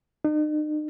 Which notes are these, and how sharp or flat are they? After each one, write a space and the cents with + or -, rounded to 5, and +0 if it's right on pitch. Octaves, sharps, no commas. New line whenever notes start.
D#4 -40